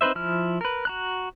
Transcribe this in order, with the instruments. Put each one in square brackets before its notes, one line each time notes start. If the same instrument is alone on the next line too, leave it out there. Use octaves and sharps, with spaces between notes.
[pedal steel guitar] C4 D#4 B4 C5 E5
F3 E4 F6
A#4 B4
F#4 A#5 F#6